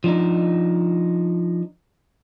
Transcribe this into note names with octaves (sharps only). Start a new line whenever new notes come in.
F3 D4 D#4